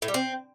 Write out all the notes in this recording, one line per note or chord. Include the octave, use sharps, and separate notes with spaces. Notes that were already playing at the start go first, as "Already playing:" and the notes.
A2
G3
C4